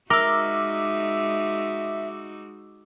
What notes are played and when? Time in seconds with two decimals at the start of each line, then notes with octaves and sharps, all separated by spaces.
0.10 G#3 D#4 F#4 A#4 E5 D6 E6